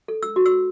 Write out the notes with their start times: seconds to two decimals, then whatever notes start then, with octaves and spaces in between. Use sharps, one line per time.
0.08 A4
0.23 E6
0.36 F#4
0.46 E6